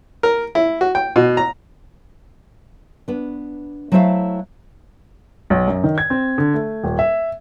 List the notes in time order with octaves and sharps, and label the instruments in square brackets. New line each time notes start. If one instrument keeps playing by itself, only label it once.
[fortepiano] A#4
E4
F#4
G5
B2
A#5
[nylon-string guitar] B3 D4
F#3 A3 E4 C5 E5 F5
[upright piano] B1
F#2
D#3
G#6
C4
D3
A3
D#1
E5